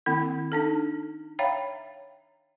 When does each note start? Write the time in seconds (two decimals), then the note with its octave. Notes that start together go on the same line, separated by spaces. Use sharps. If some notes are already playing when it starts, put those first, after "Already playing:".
0.06 D#3 A#3 C4 E4
0.52 D4 D#4 A4
1.39 C#5 E5 F5 G5 A#5 B5